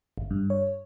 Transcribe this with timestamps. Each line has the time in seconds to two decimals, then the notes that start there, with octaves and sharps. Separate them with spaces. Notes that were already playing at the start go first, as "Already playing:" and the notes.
0.18 G1
0.31 G2
0.50 C#5